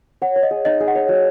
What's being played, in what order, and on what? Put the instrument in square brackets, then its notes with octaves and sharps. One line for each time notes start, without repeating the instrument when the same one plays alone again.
[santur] C#5 [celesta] F#5
[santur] C#5
[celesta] D#5
[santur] G#4
[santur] D#4 [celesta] D#5
[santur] G#4
[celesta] F#5
[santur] C#5
F#3